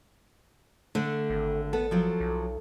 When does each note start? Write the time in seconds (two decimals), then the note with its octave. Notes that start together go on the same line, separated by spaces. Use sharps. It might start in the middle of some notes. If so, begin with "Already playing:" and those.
0.95 D3 A3 D4
1.30 G#1
1.73 B3 A4
1.91 F3 F#3 C4
2.20 B1